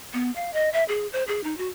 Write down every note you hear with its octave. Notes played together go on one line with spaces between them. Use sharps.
B3
F5
D#5
E5
G#4
C5
G#4
D#4
F#4